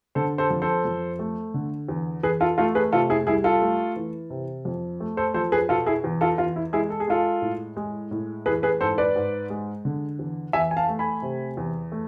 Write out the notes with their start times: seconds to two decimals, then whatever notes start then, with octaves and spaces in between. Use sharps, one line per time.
0.15 D3 A4 C5
0.38 A4 C5
0.50 F2
0.62 A4 C5
0.85 F2
1.19 A3
1.54 D3
1.89 E2
2.23 E2 G#4 B4
2.40 F4 A4
2.58 A3 F4 A4
2.75 G#4 B4
2.92 C3 F4 A4
3.10 E4 G#4
3.27 C2 E4 G#4
3.44 F4 A4
3.61 A3
3.96 E3
4.30 C3
4.65 F2
5.00 A3
5.17 A4 C5
5.34 F3 A4 C5
5.52 G#4 B4
5.69 B2 F4 A4
5.86 E4 G#4
6.04 E2
6.21 F4 A4
6.38 E2 F4
6.56 E4
6.73 G#3 E4 G#4
6.90 A4
7.00 G#4
7.08 G#3 F4 A4
7.42 A2
7.76 G#3
8.11 A2
8.46 E3 G#4 B4
8.63 G#4 B4
8.81 G#2 A4 C5
8.98 B4 D5
9.15 G#2
9.50 G#3
9.85 D3
10.19 E2
10.53 E2 E5 G#5
10.71 G#5
10.77 F5 A5
10.89 A3
10.99 G#5 B5
11.22 C3
11.57 E2
11.92 A3